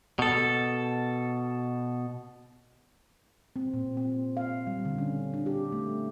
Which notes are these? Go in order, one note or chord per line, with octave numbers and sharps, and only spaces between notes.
B2 A4
C4
A#2
C4
F5
G3
D3
C#4
D4
G4
A3